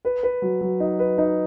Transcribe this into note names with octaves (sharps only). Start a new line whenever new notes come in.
B4
B4
F#3
F#3
D#4
B4
D#4